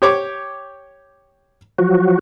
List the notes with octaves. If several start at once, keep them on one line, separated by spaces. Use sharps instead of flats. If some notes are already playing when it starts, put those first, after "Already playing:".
G4 C#5 D6
F3 F#3 F#4